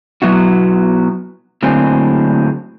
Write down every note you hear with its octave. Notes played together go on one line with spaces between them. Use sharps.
B2 F#3 B3 E4 F#4
A2 D3 F#3 A#3 C4 G#4